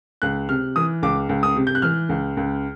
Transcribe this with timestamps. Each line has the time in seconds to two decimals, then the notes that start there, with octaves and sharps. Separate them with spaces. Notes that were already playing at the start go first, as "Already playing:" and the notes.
0.22 C#2 F#6
0.49 C3 F6
0.76 E3 D#6
1.03 C#2 D6
1.29 C#2
1.43 D#6
1.56 C3
1.67 G6
1.75 F#6
1.82 E3 F6
2.09 C#2
2.37 C#2